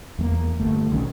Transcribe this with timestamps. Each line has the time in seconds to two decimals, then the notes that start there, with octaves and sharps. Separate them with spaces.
0.19 E2 A3 A#3
0.60 G1 A3
0.91 B1 D#3 C#4